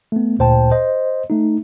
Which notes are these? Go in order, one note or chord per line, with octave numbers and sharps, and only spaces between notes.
A3 B3
D2 A#2 C5 G5 A5
C5 D#5
A3 D#4